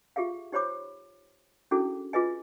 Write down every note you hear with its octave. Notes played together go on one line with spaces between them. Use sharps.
F4 G4 G#4 E5 F5
D#4 G4 C5 C#5 B5 D6
C#4 D4 E4 F#4 G#4 A4
F4 G#4 B4 D#5 G#5